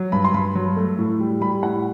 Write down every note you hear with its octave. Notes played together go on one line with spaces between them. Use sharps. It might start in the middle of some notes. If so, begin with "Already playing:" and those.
Already playing: F#3
G2 B5
C6
G2 B5
F#3
A3
A2
G3
G3 B5
A2 F#5